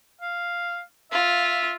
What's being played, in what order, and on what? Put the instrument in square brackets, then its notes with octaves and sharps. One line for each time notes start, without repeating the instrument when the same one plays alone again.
[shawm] F5
[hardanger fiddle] F4 [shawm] E5